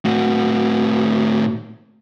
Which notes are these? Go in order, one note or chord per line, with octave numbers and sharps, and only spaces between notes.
A2 F#4